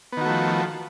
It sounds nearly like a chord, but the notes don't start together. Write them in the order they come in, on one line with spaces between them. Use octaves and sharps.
B3 D#3 F#4 A3 F3